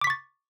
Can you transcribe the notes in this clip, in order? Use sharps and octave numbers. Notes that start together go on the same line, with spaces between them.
C#6 D6 A6 B6